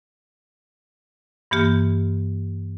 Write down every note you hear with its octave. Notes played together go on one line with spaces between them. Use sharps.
G2 E3 A#3 G4 F6